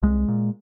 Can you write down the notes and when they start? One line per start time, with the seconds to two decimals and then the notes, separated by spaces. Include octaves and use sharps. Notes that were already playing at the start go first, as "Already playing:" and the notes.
0.03 C2 G#3
0.28 A#2